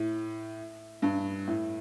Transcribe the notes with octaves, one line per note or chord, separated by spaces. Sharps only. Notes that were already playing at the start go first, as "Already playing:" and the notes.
Already playing: A2
G2
A2